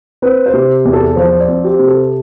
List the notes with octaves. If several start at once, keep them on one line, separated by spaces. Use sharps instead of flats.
C4 B4
C5
C3
E2
A4
F3 C5
D5
C4
G4
C3
A4